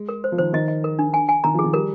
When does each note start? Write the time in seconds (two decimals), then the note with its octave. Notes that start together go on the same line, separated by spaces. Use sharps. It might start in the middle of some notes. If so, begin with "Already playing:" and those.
Already playing: G#3
0.09 A#4
0.24 C5
0.32 F3
0.38 D#3 C5
0.53 D#3 D#5
0.68 D#5
0.84 A#4
0.99 D4
1.14 G#5
1.29 G#5
1.44 D#3 A#5
1.54 F3 G#4
1.64 D#3
1.74 G3 A#4